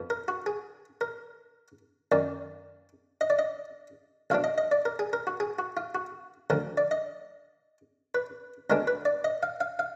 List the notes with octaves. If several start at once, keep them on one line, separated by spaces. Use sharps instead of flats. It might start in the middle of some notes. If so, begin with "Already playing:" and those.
Already playing: F2 F3 B3
A#4
F#4
G#4
A#4
F#2 D#3 A#3 D5
D#5
D5
D#5
B1 B2 F#3 D4 F5
D#5
D#5
D5
A#4
G#4
A#4
F#4
G#4
F#4
F4
F#4
D2 D3 F3 A#4
D5
D#5
B4
D2 D3 G#3 B3 D4 A#4
B4
D5
D#5
F5
F5
F5